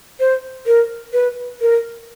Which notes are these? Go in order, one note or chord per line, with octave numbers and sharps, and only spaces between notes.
C5
A#4
B4
A#4